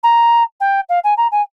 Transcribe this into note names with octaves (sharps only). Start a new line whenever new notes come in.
A#5
G5
F5
G#5
A#5
G#5